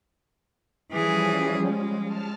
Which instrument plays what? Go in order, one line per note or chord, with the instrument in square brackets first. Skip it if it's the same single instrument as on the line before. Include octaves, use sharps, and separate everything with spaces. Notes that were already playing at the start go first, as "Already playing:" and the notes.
[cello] E3 G#4 [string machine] F3 G3 C#4
[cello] G#3
[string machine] A5 F6